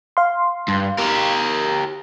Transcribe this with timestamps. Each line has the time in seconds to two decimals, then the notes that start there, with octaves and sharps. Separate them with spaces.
0.17 F5 C6
0.68 G2
0.98 G4 A#4